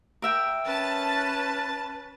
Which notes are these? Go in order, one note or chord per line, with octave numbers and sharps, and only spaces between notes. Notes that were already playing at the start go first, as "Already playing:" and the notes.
A#4 E5 G5
C#4 B4 A5 A6